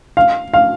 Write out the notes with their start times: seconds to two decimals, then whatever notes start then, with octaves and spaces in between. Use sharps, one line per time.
0.17 F5
0.54 F5